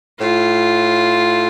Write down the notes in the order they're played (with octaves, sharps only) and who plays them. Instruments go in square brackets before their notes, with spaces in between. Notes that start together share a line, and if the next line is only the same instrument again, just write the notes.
[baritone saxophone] A2 [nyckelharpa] F4